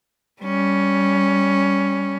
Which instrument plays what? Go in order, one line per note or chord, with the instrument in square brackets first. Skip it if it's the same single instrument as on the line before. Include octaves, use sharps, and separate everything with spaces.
[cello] G3 C#4